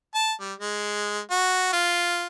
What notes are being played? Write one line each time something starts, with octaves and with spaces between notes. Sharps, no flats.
A5
G3
G#3
F#4
F4